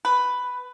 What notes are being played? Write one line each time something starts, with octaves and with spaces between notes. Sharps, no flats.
B4